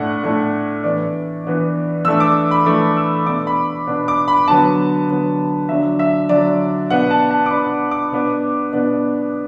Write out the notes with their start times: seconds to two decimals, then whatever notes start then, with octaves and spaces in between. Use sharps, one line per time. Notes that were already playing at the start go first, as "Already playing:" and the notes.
Already playing: A2 A3 D4 F#5
0.24 A2 A3 D4
0.84 E3 B3 D4 D5
1.45 E3 B3 D4
2.05 E3 A3 D4 E6
2.20 D6
2.51 B5
2.66 E3 A3 D4 D6
2.97 E6
3.26 B2 B3 D4 D6
3.47 B5
3.87 B2 B3 D4
4.08 D6
4.28 B5
4.48 D3 F#3 B3 A5
5.09 D3 F#3 B3
5.69 D3 F#3 D4 E5
5.99 E5
6.29 D3 F#3 D4 D5
6.90 B2 B3 D4 F#5
7.10 A5
7.31 A5
7.46 D6
7.51 B2 B3 D4 B5
7.91 D6
8.12 B2 B3 D4
8.73 B2 B3 D4